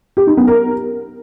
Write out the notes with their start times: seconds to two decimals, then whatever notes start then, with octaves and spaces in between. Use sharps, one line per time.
0.17 G4
0.27 D#4
0.37 B3
0.47 A#4